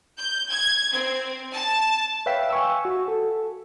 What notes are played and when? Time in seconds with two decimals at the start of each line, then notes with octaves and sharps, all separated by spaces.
0.18 G6
0.50 G#6
0.94 C4
1.53 A5
2.26 B4 C#5 E5 F5 G5 B6
2.50 G#5 C#6 E6
2.85 F#4
3.08 A4